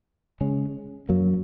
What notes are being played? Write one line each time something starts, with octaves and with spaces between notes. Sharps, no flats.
C#3 G#3 C#4
F#2 F#3 A#3